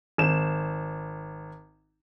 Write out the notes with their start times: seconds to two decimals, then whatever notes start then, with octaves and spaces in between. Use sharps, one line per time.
0.18 G#1 E7